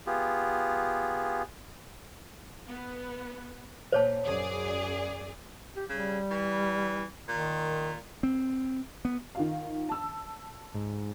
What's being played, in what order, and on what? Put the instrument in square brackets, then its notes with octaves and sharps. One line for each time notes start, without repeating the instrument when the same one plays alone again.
[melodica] B3 F4 G4 G#4
[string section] B3
[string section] A#2 [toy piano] C5 C#5 A5
[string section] F#2 G#4 D5
[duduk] G4
[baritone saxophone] C#3 [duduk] G3
[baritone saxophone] E3
[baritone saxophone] A#2 [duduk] D#3
[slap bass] C4
B3
[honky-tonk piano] D#3 F4 F5
A5 E6
[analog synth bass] G#2